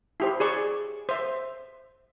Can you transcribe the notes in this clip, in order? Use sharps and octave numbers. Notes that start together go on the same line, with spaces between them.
E4 G4 C5
G#4 D5 C#6
C5 E5